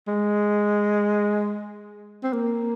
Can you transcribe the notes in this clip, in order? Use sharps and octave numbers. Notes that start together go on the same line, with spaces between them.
G#3
C4
A#3